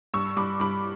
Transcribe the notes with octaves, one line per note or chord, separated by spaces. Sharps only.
G2 C#6 E6
G2 B5 D6
G2 B5 D6